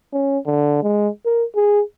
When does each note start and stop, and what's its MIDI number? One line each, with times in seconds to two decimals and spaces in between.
0.13 0.38 61
0.46 0.80 50
0.82 1.09 56
1.25 1.44 70
1.55 1.81 68